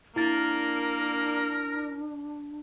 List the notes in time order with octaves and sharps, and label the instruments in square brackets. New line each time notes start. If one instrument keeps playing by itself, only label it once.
[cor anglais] A#3 [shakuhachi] D4 [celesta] E4 A6 [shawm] A#4